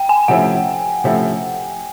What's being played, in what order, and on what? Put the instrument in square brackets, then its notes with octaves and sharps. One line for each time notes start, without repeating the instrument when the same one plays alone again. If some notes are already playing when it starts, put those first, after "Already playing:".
Already playing: [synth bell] G5
G#5
[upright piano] C3 F3 A3 C#4 E4 [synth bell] F#5
[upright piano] C3 F3 A3 C#4 E4